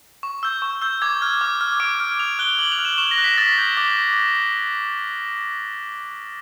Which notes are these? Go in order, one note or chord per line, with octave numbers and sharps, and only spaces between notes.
C#6
E6 G6
C#6
E6 G6
D6 G#6
F6
D6
F6
D6 D7
F6
D#6 F7
F#6 G7
D6 F#7
F7
F6
E7
C#6 E7
A#6
F#6
B6
D#6 A6
G6
D6